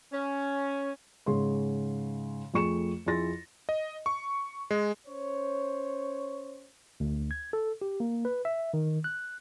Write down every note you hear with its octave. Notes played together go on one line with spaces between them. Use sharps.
C#4
G#2 C#3 G#3 C#5 C6
F2 A3 G#4 C#6 C#7 E7
F2 E4 G#4 C6 A6 A#6
D#5
C#6
G#3
C#4 C5 C#5
D2
G#6
A4
G4
A#3
B4
E5
D#3
F#6